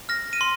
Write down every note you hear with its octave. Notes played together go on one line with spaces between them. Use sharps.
F6 A#6
D#7
C6